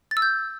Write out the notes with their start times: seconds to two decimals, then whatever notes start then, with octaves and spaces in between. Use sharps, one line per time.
0.11 A6
0.17 E6
0.22 G6